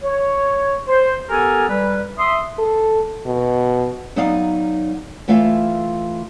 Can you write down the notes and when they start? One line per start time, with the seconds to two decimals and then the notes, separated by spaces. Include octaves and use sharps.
0.02 C#5
0.87 C5
1.30 B3 G4 A4 A#4 G#5
1.69 G3 B4
2.19 E5 C6 D#6
2.59 A4
3.26 B2
4.16 F#3 B3 D#4 D5 D#5 F5
5.28 E3 A3 F4 E5 F5